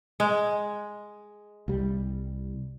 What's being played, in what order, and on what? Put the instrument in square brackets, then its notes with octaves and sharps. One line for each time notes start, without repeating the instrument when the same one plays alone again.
[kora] G#3
[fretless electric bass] C2 G3